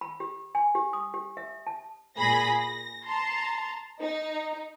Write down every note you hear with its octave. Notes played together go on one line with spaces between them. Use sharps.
B5
G4
G#5
G4
D#6
G4
E5
A5
A#2 G#4 B5 A#6
A#6
A5 A#5 C6
D#4